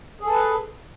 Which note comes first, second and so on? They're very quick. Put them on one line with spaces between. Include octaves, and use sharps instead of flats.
G#4 A4 B4